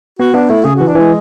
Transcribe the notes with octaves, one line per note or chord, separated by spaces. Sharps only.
B3 F#4
B3 D4
A3 E4
C#3 G#4
F#4
E3
D4
E3 G#3